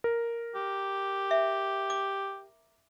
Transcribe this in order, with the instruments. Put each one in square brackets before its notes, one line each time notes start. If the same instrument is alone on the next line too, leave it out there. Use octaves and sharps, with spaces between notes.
[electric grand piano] A#4
[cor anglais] G4
[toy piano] E5
D6